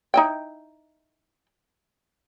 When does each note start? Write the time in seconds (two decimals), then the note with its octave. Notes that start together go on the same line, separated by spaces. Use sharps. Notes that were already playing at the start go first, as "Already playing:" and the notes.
0.14 D#4 E4 G5